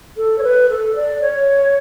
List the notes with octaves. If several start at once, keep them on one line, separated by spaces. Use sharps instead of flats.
A4
C#5
B4
A4
D5
C#5